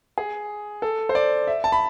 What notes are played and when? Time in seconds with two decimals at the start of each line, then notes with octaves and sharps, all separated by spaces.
0.18 G#4
0.82 A4
1.09 C5
1.15 D5
1.47 E5
1.64 A5
1.72 B5